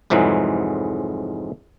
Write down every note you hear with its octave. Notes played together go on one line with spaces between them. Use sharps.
C2 F2 G#2 E3 F#3 G#3